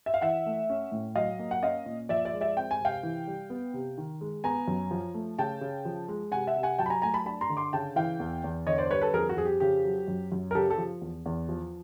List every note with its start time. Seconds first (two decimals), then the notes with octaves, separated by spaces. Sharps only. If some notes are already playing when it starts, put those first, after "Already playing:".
0.06 E5
0.14 F5
0.21 E3 E5 F#5
0.46 A3
0.69 C#4
0.92 A2
1.15 F#3 D#5 F5
1.39 A#3
1.51 F#5
1.63 C#4 D#5 F5
1.86 A#2
2.09 F3 D5 E5
2.25 D5 E5
2.33 G#3
2.41 D5 E5
2.57 C4 G5
2.71 G#5
2.80 C3 F5 G5
3.03 E3
3.28 G3
3.50 B3
3.74 C3
3.98 D#3
4.21 G#3
4.44 B3 G#5 A#5
4.68 F#2
4.91 F3
5.14 A3
5.38 C#3 G5 A5
5.61 C#3
5.85 F3
6.08 G#3
6.32 C3 F#5 G#5
6.47 E5 F#5
6.56 C3
6.63 F#5 G#5
6.79 F#3 G5 A5
6.86 B5
6.90 G#5 A#5
7.02 A3 G#5 A#5
7.14 A5 B5
7.26 D4 A5 B5
7.41 A#5 C6
7.50 D3
7.57 C6 D6
7.73 C#3 G5 A5
7.96 E3 F5 G5
8.20 E2
8.44 E2
8.66 D3 C#5 D#5
8.78 C5 D5
8.90 G3 B4 C#5
9.01 A4 B4
9.14 F2 G#4 A#4
9.29 F#4
9.37 F2 G#4
9.45 G4
9.60 C#3 G4
9.85 F#3
10.08 F#2
10.32 F#2
10.51 A#4
10.55 C#3 G4 A4
10.70 G4 A4
10.78 F3
11.01 E2
11.26 E2
11.49 F3